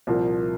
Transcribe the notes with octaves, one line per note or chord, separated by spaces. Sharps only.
C2 A#2 F3 A#3